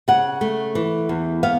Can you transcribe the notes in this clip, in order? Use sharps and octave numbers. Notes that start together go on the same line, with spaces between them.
C#3 F#5
A3
E3
E2
B3 F5